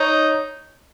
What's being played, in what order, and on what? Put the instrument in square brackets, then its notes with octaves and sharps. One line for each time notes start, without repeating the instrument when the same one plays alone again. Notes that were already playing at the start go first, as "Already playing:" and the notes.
Already playing: [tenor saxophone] D#4 [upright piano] C#5